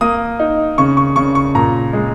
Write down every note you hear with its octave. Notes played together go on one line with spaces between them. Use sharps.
A#3 D#6
D#4
C#3 C#6
C#6
C#3 C#6
C#6
A#2 A#5
G#3